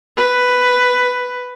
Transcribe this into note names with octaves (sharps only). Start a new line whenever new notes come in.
B4